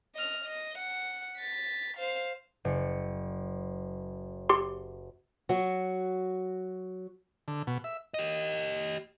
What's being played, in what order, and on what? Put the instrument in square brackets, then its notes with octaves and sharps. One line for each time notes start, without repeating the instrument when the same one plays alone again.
[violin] D#5 F6
D#5
F#5
A6 B6
C5 F5
[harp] F#1 C#7
[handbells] G4 C6
[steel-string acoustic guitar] F#3 F#4
[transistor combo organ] D3
B2
E5
[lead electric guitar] G4 D#5